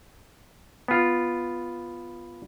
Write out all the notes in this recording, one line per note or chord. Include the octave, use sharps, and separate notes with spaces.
B3 F4